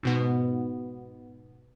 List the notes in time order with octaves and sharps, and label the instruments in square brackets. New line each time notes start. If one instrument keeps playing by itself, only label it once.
[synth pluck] G#2 B2 B3